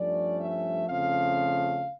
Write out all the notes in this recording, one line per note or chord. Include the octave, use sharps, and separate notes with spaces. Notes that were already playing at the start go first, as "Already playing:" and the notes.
Already playing: G2 F3 A3 C#4 D5
E5
F2 C#3 F3 A3 C#4 F5